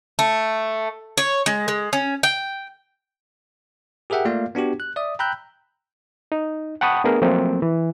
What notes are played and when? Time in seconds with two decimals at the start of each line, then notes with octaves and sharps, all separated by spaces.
0.19 A3
1.17 C#5
1.46 G#3
1.68 G#3
1.93 C#4
2.23 G5
4.10 G4 G#4 A#4 E5 F#5 G5
4.25 A3 A#3 F4 D5 F5
4.55 B3 D4 F#4 G4
4.80 F#6
4.96 D5 E5 D#6
5.19 G5 A#5 B5 E6 F#6 G6
6.32 D#4
6.81 F#5 G5 A5 B5 C#6 D#6
7.04 A3 B3 D4 G#4 A#4
7.22 F3 F#3 A3 A#3 C4
7.62 E3